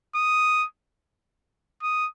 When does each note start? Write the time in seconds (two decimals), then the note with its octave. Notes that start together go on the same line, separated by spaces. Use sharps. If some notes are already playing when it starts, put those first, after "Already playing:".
0.15 D#6
1.83 D#6